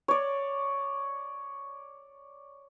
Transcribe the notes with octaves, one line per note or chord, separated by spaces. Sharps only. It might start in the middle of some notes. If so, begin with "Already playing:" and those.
C#5 D5